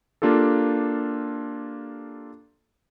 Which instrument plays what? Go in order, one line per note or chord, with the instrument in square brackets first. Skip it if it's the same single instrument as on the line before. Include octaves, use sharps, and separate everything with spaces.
[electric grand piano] A#3 D4 F4 G4 A4